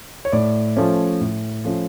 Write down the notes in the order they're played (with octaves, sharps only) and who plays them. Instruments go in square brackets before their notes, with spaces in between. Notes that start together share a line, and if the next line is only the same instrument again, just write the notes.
[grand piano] C#5
A2 D5
F3 A3 C#4
A2
F3 A3 C#4